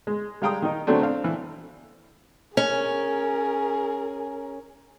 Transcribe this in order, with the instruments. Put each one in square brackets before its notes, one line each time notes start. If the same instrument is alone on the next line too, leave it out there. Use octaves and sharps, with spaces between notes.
[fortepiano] G#3
G3 G#3 F5 G5 A#5 D#6
D#3 D#4
D3 F#3 A3 C4 D4
C4 D4 F5
E3
[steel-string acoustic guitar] C#4 [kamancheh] G#4 A#4